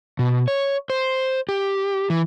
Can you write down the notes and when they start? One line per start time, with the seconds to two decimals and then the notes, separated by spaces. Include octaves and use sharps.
0.19 B2
0.48 C#5
0.90 C5
1.49 G4
2.10 E3